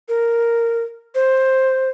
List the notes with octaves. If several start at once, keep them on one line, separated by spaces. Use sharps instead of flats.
A#4
C5